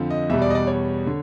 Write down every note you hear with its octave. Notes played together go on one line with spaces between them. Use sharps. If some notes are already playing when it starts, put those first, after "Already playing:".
Already playing: F2 D3 F3
D#5
E2 B2 G3 E5
D5
D#5
D5
C#5
D3